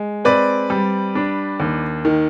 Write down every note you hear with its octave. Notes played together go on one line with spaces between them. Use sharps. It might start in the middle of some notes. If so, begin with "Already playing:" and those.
Already playing: G#3
C4 B4 D5
G3
D4
D#2
D#3